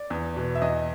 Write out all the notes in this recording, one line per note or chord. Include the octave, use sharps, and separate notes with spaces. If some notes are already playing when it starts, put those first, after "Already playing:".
Already playing: D5
E2
B2
E5
E2 D#5